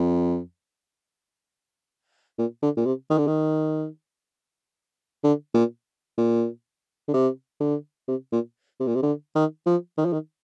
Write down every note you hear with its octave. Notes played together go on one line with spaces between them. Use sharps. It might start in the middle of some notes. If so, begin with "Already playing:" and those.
Already playing: F2
A#2
D3
A#2
C3
D#3
D3
D#3
D3
A#2
A#2
D3
C3
D3
C3
A#2
C3
A#2
C3
D3
D#3
F3
D#3
F3
D#3